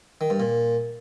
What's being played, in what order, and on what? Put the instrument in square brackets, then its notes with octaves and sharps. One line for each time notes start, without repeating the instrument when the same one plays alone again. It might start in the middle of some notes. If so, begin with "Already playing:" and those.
[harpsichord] D#3
G2
A#2